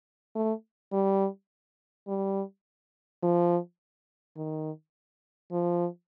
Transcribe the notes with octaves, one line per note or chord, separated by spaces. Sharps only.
A3
G3
G3
F3
D#3
F3